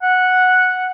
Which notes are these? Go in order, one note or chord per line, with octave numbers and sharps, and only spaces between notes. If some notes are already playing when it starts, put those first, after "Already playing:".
F#5